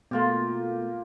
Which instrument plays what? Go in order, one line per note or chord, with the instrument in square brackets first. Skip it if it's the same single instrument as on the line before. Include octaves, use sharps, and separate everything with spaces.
[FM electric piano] B2 A3 [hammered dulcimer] A#3 F4 G4